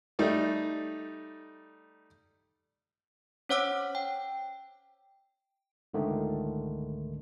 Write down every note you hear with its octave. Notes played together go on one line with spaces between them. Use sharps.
G3 A3 D#4
C#4 C5 C#5 F#5 D6 E6
G5
C#2 G#2 D3 D#3 A3